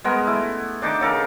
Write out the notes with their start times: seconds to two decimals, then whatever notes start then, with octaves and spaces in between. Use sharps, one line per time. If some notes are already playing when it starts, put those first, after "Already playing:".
0.04 G#3 B3 A#4
0.27 A3 E4
0.82 D4 D#4 A5 D6
1.01 C#3 A4 A#4